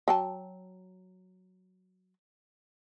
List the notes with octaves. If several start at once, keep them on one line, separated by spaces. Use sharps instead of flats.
F#3 G5 A5